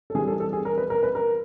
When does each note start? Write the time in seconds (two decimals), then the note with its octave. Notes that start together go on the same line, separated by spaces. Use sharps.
0.10 A4
0.15 E3 G3 C4 G#4
0.28 A4
0.40 A4
0.53 G#4
0.65 A#4
0.78 B4
0.90 A#4
1.03 B4
1.15 A#4